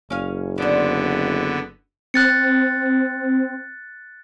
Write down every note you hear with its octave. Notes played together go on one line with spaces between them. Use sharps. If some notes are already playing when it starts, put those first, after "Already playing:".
F#1 C#4 F5
D3 B3 D4 C5
C4 F#6 A6 C#7